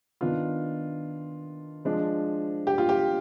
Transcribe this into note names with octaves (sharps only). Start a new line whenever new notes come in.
D#3 B3 D4 F4
F3 G#3 D4
G4
F4
G4